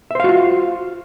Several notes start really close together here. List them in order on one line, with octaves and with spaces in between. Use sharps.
E5 C5 F5 F#4 F4